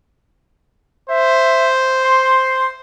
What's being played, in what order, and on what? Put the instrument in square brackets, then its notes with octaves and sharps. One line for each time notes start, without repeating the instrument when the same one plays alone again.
[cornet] C5 [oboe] E5
[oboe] C6